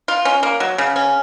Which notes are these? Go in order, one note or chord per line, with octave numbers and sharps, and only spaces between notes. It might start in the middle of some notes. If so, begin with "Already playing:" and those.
F4
C#4
A#3
F#3
C#3
C#4